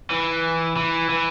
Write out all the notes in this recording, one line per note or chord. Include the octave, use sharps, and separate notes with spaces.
E3
E3
E3